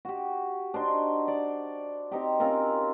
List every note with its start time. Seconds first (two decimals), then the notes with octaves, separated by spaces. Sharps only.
0.05 F#4 G4
0.74 D4 D#4 C5
1.28 D5
2.12 C4 D#4 G4
2.40 C4 C#4 F4 A#4